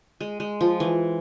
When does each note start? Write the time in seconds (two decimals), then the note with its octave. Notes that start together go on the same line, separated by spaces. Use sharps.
0.21 G#3
0.40 G#3
0.61 F3
0.80 E3